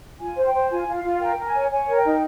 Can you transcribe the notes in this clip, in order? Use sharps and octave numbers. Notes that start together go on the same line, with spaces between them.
F4 G#5
C5
G5
C5
F4 G#5
F4
F5
F4
A#4 G5
A#4
G#5
C#5
C#5 G#5
A#4
G5
D#4